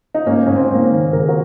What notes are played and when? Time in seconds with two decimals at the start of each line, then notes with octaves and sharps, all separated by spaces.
0.15 D#4
0.26 G#2 A#3 C#4
0.46 G#2 C#4
0.55 C4
0.70 G#2 A#3
0.84 C4
0.92 D#3
1.13 G#2 A#4
1.20 G#4
1.28 F#4 A#4